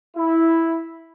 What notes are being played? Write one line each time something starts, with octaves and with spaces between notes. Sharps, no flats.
E4